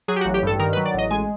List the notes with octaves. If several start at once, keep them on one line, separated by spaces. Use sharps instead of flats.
F#3 G#4
G4
F#4
A1
G4
G2 A4
D#3 A#4
B4
F#3
D5
A1 D#5
G#3 G#5